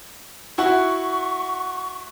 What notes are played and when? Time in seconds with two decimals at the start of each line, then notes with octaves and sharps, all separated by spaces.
0.58 E4 F#4 F#5 C#6